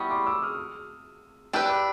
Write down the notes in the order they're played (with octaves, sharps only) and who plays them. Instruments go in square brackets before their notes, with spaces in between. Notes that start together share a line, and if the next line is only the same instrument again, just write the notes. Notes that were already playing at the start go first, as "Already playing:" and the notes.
Already playing: [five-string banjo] E3 G3 B3 [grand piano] C#6 D#6
[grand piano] C6 D6
D6 E6
D#6 F6
[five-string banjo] D4 G4 B4 [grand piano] E6 F#6
[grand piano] D6 E6